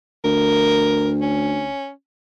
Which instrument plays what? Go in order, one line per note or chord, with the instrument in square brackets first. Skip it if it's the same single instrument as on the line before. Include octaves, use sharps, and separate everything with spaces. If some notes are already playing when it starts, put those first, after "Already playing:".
[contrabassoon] D2 [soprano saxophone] A#4
[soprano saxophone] C#4